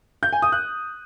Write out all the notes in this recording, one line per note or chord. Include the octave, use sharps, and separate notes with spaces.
G6
G#5
D#6
F#6